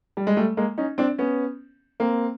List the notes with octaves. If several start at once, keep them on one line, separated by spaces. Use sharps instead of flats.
G3
G#3
G3 A3
G#3 A#3
C#4 D#4
C4 D4
B3 C#4
A#3 C4